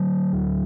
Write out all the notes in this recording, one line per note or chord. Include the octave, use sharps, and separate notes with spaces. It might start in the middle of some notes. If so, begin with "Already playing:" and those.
Already playing: D3 F#3
D2